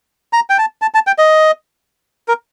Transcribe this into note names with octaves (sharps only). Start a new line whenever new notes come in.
A#5
G5
A5
A5
A5
G5
D#5
A#4